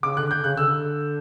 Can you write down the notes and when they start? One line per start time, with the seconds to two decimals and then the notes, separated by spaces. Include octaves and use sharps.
0.03 C#3 D6
0.17 D3 F#6
0.31 G6
0.44 C#3 F#6
0.57 D3 E6